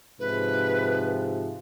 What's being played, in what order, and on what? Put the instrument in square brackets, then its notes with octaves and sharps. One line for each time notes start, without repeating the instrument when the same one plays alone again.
[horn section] G#2 C3 F3 [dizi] B4